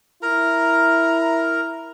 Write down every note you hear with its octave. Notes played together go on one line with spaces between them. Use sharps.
E4 A#4 A#5